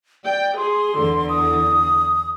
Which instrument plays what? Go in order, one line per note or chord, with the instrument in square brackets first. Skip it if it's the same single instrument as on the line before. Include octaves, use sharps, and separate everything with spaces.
[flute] D5 [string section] G5
[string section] G#4 [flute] C6
[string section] E2 D3
[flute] D#6